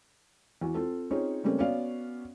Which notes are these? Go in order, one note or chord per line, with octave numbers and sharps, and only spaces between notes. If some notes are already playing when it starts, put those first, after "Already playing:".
E2 F#4
C4 F4 A4
C4 C#4 D#4 F4 G#4 C#5
C#3 G3 A3 A#3 C4 C#4
B3 C#4 F#4 D5 F5